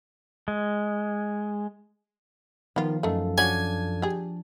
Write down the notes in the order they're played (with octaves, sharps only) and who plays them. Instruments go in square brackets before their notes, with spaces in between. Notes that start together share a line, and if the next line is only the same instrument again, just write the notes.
[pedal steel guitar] G#3
[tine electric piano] D#3 [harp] F3 [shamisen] B3 F4
[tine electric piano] F#2 A4 F5 [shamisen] D#3 A3
[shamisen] C#4 F#4 [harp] D4 [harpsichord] G#5
[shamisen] G4 G#4